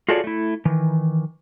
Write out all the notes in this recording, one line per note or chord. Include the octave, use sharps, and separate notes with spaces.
F4 F#4 G#4 A4 C#5 D5
A3 E4
D#3 E3